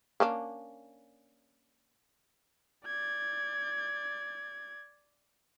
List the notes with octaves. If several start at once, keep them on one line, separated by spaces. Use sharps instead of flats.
A#3 C#4 D4
D5 G#6